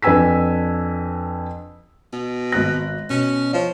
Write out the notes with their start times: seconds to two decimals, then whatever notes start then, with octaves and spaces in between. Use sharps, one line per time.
0.02 F2 D4 B4 G#5 E6 B6
2.13 B2
2.52 G#1 F#6 A#6
3.10 B2 C#4
3.53 F3 C#5